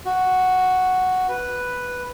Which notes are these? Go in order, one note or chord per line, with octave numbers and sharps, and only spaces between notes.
F#4
B4